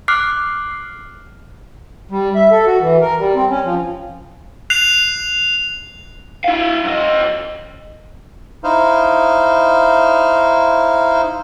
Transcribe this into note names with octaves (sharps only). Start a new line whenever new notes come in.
D6 F6 F#6 C7
G3
E5
A4
F#4
E3
A#4
G3
C4
C#4
F3
F#6 C7 F7
E4 F5
F#2 D#5
D#4 E4 C5 F5